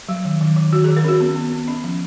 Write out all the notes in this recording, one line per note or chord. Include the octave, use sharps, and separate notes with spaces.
F#3
D#3
D#3
D#3
D#3 F#4
D#3 G#4
A#4
C#4 F#4
B3
B3
B3
C#4
F3